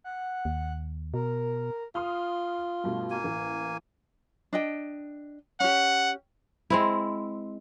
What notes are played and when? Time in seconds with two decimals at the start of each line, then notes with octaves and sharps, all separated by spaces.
0.04 F#5
0.45 D#2
1.14 B2 A#4
1.95 F4 C6 D#6 F6
2.84 G2 B2 A3
3.11 A#3 G#5
3.24 A1
4.53 D4 D#5 G5
5.60 C#4 G4 F#5
6.70 G#3 C4 E4